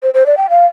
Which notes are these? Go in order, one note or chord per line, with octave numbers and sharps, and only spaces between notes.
C5
C5
D5
G5
F5